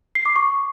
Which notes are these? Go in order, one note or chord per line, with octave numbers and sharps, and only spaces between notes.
C7
D6
C#6